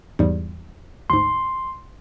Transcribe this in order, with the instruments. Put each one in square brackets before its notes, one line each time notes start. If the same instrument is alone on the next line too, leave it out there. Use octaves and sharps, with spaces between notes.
[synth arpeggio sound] E2 G#2 G3
[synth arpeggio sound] D2 G#2 [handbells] C6